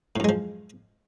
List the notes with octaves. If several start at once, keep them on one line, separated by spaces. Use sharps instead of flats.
F#2 A2 F3 G#3